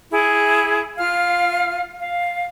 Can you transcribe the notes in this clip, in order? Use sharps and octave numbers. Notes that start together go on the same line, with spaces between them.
E4 G#4
F4 F5 F6
F5